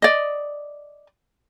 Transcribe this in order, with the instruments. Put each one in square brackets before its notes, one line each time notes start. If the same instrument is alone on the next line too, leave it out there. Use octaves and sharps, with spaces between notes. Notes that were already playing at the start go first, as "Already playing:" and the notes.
[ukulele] D5 D#5